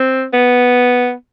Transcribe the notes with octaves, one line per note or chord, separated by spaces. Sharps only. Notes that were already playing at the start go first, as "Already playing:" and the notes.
Already playing: C4
B3